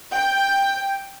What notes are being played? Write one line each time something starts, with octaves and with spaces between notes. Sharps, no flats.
G5